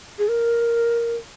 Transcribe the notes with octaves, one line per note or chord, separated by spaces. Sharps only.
G#4
A#4